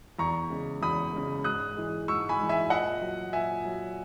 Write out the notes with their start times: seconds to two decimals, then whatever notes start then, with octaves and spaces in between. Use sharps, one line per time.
0.19 E2 A#5 C#6
0.50 C#3 G#3
0.82 E2 B5 D#6
1.13 C#3 G#3
1.44 G#2 D#6 F#6
1.77 E3 G#3
2.08 G#2 C#6 E6
2.29 G#5 B5
2.39 E3 G#3
2.49 E5 G#5
2.70 A#2 D#5 F#5
3.01 F#3
3.33 A#2 E5 G#5
3.65 F#3